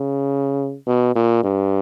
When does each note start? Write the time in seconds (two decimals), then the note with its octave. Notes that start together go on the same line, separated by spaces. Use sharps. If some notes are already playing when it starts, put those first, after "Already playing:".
Already playing: C#3
0.87 B2
1.15 A#2
1.44 G2